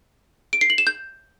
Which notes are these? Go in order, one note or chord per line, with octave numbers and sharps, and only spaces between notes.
D7
C7
F#7
E7
G6